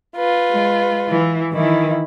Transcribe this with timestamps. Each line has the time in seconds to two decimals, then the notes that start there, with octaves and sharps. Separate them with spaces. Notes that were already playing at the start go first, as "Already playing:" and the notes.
0.16 F4 B4
0.50 G#3
1.09 E3
1.53 D#3 E3 E4